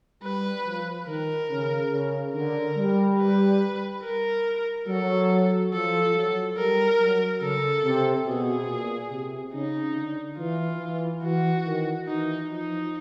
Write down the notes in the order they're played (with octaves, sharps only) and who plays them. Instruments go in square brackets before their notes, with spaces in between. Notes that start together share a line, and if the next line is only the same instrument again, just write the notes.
[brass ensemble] G3 [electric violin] B4
[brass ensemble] F3
[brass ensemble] D#3 [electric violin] A#4
[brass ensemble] C#3
C#3
[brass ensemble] D3 [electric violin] A#4
[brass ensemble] G3
[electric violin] B4
A#4
[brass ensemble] F#3 [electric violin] A4
[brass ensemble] F3 [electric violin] A4
[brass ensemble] F#3
[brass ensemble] G3 [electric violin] A#4
[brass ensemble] F#3
[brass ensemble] C#3 [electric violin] A4
[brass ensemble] C3
[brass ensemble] B2 [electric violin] G#4
[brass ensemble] A#2
C3
[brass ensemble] C#3 [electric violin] D#4
[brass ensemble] D3
[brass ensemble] E3 [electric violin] F4
[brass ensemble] E3
[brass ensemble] E3 [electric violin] F#4
[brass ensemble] D#3
[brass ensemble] E3 [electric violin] D#4
[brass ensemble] F3 [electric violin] D#4